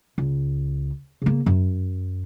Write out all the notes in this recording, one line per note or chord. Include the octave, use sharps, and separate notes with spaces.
C#2
C#3 A#3
F#2